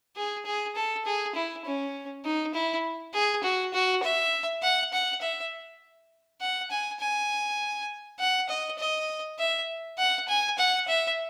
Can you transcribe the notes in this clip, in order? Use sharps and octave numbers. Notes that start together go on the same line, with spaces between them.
G#4
G#4
A4
G#4
E4
C#4
D#4
E4
G#4
F#4
F#4
E5
F#5
F#5
E5
F#5
G#5
G#5
F#5
D#5
D#5
E5
F#5
G#5
F#5
E5